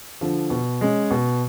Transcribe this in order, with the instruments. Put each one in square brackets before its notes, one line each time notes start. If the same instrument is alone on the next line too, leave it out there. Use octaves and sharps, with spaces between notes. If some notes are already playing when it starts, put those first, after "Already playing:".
[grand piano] D3 F3
B2
G#3 C#4
B2